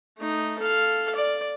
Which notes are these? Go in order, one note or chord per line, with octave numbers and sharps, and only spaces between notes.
A3 D#4
A4 F5
D5